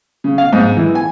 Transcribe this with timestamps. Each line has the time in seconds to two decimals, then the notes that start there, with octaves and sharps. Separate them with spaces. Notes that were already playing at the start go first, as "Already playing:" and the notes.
0.24 C#3
0.38 F5
0.53 G#2
0.77 E3
0.95 G#5